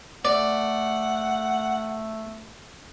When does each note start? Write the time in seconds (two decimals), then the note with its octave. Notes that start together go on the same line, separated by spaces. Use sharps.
0.25 A3 D5 F#5